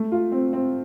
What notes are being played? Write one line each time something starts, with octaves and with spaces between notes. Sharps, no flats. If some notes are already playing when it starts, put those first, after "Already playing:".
Already playing: A3
F4
C4
C4